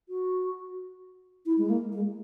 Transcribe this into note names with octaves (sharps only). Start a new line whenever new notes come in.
F#4
E4
G#3
A#3
G#3